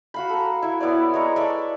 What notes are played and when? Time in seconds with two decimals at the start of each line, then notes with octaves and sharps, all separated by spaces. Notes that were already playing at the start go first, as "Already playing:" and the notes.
0.14 F#4 F5 B5
0.29 A4 A#5
0.62 E4 E5
0.80 B3 E4 C#5 D5
1.14 G#3 C#5 A#5 C#6
1.36 A4 D5 E5